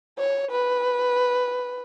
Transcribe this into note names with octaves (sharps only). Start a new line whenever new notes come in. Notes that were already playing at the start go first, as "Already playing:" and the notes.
C#5
B4